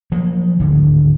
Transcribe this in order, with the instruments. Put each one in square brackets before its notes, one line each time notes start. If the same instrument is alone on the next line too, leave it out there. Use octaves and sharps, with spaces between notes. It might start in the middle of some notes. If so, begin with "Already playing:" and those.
[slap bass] F3 F#3 A#3
D1 G#1 A2 D3